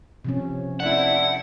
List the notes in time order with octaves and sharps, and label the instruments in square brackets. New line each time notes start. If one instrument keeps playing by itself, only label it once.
[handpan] C3 F3 C#4
[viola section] A3 C4 E4 [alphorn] D4 [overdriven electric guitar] F#5